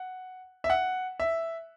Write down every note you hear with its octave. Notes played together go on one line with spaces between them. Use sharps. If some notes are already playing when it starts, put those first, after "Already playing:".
Already playing: F#5
E5
F#5
E5